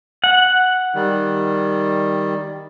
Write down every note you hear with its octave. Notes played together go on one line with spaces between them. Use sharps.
F#5
D#3 G3